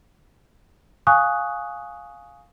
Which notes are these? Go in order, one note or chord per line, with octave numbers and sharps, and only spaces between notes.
F5 G#5 C#6 D#6 F#6